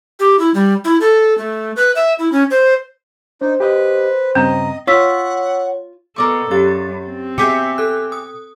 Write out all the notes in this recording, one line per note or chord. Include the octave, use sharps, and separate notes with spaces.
G4
E4
G3
E4
A4
A3
B4
E5
E4
C#4
C5
D4 D#4 C5
G4 B4 D#5
G2 C#3 C4 D#5 A#5
F4 C#5 F#5 C#6 E6 B6
B2 A4 A#4 D5 C#6
F#2 G4 A6
C4
B2 G4 G#4 E5 G6 B6 C#7
A4 F#6
D#6